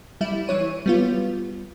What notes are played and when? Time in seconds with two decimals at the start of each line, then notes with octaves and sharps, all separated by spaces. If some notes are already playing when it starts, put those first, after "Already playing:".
0.21 G3 E4
0.48 E3 C#5 D#7
0.86 G3 B3 F4